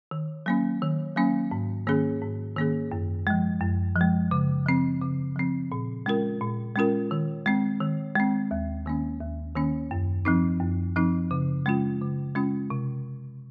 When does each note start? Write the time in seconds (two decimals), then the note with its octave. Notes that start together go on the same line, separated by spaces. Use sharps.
0.11 D#3
0.46 F#3 A#3 C#4
0.82 D#3
1.16 F#3 A#3 C#4
1.51 G#2
1.87 D#3 A#3 C#4 G#4
2.22 G#2
2.56 D#3 A#3 C#4 G#4
2.92 F#2
3.27 F3 G#3
3.61 F#2
3.96 F3 G#3
4.31 C#3
4.66 F3 C4
5.02 C#3
5.36 F3 C4
5.72 A#2
6.06 G#3 C#4 F4 A#4
6.41 A#2
6.76 G#3 C#4 F4 A#4
7.11 D#3
7.46 G#3 C4
7.81 D#3
8.15 G#3 C4
8.51 D#2
8.86 D#3 A#3 C#4
9.21 D#2
9.55 D#3 A#3 C#4
9.91 F#2
10.25 F3 C4 D#4
10.61 F#2
10.96 F3 C4 D#4
11.31 C#3
11.66 G#3 C#4 F4
12.01 C#3
12.35 G#3 C#4 F4
12.70 C3